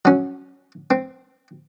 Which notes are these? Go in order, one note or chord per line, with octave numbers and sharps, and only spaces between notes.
F#3 C#4
C4